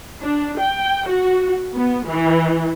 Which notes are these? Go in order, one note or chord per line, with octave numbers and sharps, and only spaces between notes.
D4
G5
F#4
B3
E3